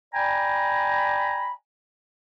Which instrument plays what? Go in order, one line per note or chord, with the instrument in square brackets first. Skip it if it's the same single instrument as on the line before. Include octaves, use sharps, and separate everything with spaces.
[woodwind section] D5 G5 G#5 A#5 B5